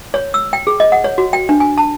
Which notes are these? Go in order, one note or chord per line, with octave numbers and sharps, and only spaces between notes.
C#5
E6
G5
G#4
D#5
F#5
C#5
F#4
G5
D4
G#5
A5